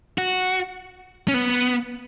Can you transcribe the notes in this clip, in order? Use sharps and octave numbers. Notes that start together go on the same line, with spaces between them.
F#4
C#4
B3